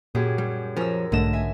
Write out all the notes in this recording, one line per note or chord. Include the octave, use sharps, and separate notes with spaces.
F#2 A#2 G4 G#4
G3
F3 C#4 A#4 E6
B1 G#2 D3 A3 D#5 E7
E5 G#5